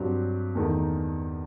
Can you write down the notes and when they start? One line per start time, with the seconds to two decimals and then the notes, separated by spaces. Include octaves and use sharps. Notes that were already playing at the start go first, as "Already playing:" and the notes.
Already playing: G2 F#3 C4 G4
0.55 E2 D#3 A3 D#4